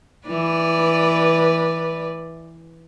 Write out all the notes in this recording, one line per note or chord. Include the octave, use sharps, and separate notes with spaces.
E3 B4 D5